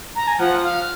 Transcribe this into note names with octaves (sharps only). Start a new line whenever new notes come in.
A#5
G#5
F3 F#5
F5